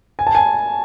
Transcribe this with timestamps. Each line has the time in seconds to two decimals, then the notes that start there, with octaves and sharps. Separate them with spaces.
0.19 G#5
0.27 A5
0.35 G#5